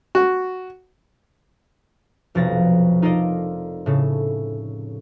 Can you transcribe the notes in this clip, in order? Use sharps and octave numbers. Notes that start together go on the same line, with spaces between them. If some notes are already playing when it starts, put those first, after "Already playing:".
F#4
F1 B1 F3 A6 A#6
D#4 F4 A4 A#4 D5 D#5
A2 C#3 A4